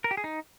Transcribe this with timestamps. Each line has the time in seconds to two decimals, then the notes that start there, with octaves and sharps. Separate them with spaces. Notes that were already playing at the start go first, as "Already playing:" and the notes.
0.04 A#4
0.11 G4
0.17 G#4
0.24 D#4